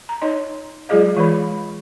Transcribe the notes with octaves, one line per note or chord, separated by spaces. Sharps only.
A#5
D#4 C#5 D#5 C6
F#3 G#3 F4 G#4 D#5 F5
E3 G#3 B4 B5